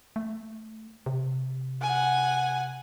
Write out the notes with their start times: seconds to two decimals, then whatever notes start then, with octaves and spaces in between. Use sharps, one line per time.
0.16 A3
1.06 C3
1.82 F#5 G#5